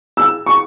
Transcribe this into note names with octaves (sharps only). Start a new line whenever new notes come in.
E6
C#6